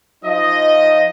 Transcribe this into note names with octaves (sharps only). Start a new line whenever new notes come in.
F3 D#4 D#5